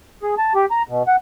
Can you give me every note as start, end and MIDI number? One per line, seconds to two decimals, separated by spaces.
0.23 0.35 68
0.38 0.53 81
0.55 0.65 67
0.71 0.82 82
0.88 1.03 47
1.08 1.16 78